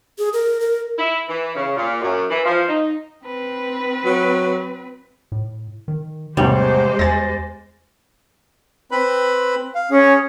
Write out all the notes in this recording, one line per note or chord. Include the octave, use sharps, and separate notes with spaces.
G#4
A#4
A#4
E4
E3
C#3
A#2
F#2
E3
F3
D#4
C4 B4
F#3
A2
D#3
A1 E2 C3 G3 G#3 G4 C5
E2 G#5 A6 A#6
C4 B4 B5
F5
C#4 G#4 C#5